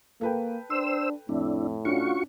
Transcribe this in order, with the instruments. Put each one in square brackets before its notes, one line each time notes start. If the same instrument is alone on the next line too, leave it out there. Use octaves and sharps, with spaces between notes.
[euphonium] A#3 [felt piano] A4 B4 G5
[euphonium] D4 [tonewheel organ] C5 E6
[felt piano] F2 [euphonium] A2 [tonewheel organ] D4 E4
[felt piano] C#4 D4 [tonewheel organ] F4 F#4 C#6